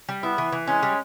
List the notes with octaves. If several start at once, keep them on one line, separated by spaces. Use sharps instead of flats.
G3
B3 E4
E3
E3
G#3 C#4
G3